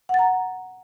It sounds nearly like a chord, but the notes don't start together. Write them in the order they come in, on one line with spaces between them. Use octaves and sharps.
F#5 A6 A#5